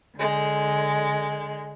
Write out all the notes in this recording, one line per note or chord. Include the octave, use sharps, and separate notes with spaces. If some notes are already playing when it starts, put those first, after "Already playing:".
D3 G#3